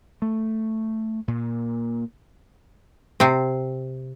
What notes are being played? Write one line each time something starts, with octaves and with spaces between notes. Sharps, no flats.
A3
A#2
C3 C4